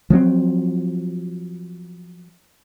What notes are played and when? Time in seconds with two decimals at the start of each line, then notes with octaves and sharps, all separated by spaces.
0.10 F3 F#3 A#3 C4